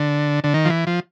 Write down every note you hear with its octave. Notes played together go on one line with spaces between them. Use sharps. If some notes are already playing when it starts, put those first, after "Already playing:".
Already playing: D3
D3
D#3
F3
E3
F3